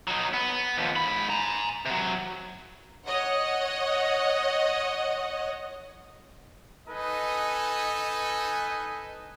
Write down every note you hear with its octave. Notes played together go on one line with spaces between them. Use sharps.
F#3 D#4
B3
D#2 F3
G#2 B5
G#5 A#5
C3 F#3
C#5 D#5 F#5
D#4 A4 B4 D#5 G#5